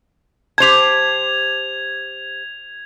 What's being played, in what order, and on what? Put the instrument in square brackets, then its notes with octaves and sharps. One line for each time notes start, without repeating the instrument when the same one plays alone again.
[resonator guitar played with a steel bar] G4 C5 A5 [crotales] G#6 F7